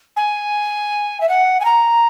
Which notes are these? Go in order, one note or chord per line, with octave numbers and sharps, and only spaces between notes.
G#5
E5
F#5
G#5
A#5